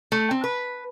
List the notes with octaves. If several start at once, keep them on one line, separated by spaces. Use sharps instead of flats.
A3
C4
B4